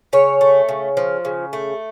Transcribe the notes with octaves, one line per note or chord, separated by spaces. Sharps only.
C#3 C#5
A3
C#3
F3
C#3
A3